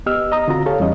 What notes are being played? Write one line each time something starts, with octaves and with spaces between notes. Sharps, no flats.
B3 G4 D#5 E6 F6
D#5 A#5 D#6
D3 C4 F4 F#4 A#5
G4 A4 C#5 F5
E2 E3 G3 C#4 D#5